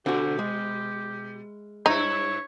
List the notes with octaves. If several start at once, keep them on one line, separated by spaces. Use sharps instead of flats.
B2 D3 F#4 G4
G#3
G2 D#4 E4 C#5